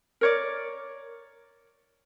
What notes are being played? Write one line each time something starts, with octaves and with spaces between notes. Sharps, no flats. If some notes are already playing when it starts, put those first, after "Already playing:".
A#4 C#5 D5